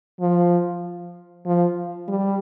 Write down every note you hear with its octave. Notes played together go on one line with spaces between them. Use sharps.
F3
F3
G3